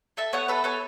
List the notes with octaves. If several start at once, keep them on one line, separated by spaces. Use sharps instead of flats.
A4 E5 A5
B3 C#5 F#5
A4 B4 E5
B3 A4 C#5